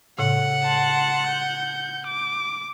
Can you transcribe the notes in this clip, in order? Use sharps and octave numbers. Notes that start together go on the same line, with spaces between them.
A2 C#3 F#5
A5 C6
G6
D6